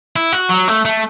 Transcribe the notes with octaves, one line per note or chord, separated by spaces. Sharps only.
E4
F#4
F#3
A3
A3